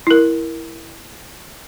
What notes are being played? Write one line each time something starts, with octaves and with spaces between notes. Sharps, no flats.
E4 A#4